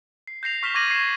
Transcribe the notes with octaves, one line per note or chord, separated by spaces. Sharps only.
C7
G6 A#6 C7 F7
C#6 F6 B6 C7 E7 G7
C#6 D6 G#6 A#6 D#7 F#7
C7 E7